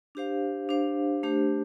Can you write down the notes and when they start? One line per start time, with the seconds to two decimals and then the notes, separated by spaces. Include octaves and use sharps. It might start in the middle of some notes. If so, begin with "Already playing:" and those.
0.15 D4 G4 C5 F5
0.69 D4 G4 C5 F5
1.23 A3 D4 G4 C5